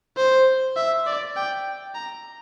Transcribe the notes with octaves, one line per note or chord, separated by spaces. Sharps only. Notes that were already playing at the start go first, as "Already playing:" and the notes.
C5
E5
D5
G5
A#5